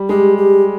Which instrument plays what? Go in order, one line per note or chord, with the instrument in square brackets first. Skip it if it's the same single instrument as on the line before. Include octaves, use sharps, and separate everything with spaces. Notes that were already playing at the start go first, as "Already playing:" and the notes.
Already playing: [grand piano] G3
[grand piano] G#3 [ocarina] G4
[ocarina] G4